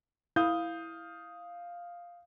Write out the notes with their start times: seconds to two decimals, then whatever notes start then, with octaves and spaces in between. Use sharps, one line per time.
0.36 E4 F5 D#6 G6